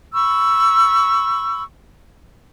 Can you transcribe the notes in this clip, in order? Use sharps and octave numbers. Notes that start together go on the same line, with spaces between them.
B5 C#6 E6